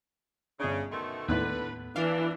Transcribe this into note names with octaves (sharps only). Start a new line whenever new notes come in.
G1 C#3 D4
B2 D#3 A3 C6
D#2 A2 D3 B3 B4 F#6
E3 D4 F5